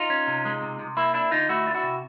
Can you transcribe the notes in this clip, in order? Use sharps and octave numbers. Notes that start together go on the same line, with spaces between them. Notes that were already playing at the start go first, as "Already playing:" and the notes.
Already playing: D#4 F4
C#4
C3
G#3
C3
C3
A#3 E4
D4 E4
D3 D#4 F4
A3 E4 F#4
D4 F4
E4 F#4
C3